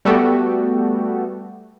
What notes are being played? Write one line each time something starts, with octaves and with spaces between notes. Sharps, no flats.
G3 A3 B3 F#4 G4 A4